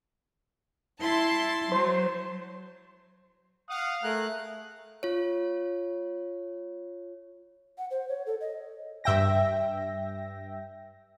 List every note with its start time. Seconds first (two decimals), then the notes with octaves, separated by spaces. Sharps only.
1.00 E4 A5 C6
1.72 F#3 C5
3.69 F5 F#5 D#6
4.03 A3 G#4 A#4 F#6
5.03 F4 C#5
7.78 F#5
7.91 C5
8.09 C#5
8.26 A4
8.41 D#5
9.04 G2 E5 G5 A#6